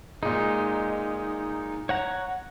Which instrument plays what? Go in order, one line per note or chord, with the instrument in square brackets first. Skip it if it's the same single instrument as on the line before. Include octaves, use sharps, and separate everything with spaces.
[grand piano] A#2 G#3 [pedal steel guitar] D#4
[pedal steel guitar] C#5 F#5 A#5